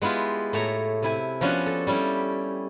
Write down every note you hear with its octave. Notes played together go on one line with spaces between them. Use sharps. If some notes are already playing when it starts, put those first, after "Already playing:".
G#3 B3 E4 F4 G4
A2 A3 C#5 A#5
C3 E4 G#5
F3 B3 C#4 D4 F#4
A4
G3 C#4 E4 G4